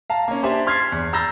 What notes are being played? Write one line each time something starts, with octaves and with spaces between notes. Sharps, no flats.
F5 A5 A#5
A#3 C#4
D4 G4 C5 E5 G#5
C6 F6 G#6 A6 B6 C7
E2
A#5 B5 E6 G6 A6 A#6